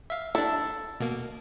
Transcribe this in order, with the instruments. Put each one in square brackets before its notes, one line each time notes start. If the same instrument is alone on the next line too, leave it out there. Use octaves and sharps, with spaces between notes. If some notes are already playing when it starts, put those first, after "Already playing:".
[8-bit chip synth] E5 F5
[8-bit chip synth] D4 E4 [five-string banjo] A4
[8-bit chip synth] B2 A#3